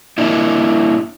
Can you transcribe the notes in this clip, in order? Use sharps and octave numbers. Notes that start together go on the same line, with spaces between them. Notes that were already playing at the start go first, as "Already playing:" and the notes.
A#3 D4 E4